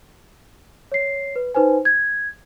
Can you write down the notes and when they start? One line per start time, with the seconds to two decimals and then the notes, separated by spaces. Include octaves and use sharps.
0.92 C#5 C7
1.36 B4
1.55 D#4 B4 C5 G#5
1.85 G#6